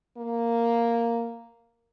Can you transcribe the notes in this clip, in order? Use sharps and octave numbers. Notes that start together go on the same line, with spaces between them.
A#3